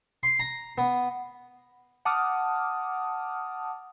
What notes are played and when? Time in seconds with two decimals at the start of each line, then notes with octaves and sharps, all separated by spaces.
0.23 C6
0.40 A#5
0.78 B3
2.05 F#5 A5 D6 D#6 F6